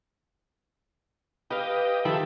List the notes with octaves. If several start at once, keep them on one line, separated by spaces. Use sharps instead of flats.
G4 B4 D#5 F5
D#3 F3 G4 A4 E5 B5